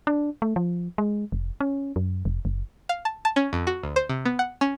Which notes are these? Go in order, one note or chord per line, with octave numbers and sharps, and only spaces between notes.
D4
A3
F3
G#3
F1
C#4
F#2
F1
F#1
F5
A5
A5
C#4
F2
F#4
D2
C5
C3
B3
F#5
C#4